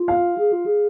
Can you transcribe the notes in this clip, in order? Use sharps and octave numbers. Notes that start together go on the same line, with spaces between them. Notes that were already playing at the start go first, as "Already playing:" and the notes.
Already playing: F4
F5
G#4
F4
G#4